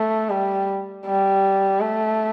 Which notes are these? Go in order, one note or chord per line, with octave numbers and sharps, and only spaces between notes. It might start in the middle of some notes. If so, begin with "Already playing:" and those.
Already playing: A3
G3
G3
A3